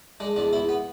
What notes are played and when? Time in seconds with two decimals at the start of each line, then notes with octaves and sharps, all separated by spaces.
0.20 G#3 D4
0.36 E2 D4
0.53 E2 E4
0.69 B3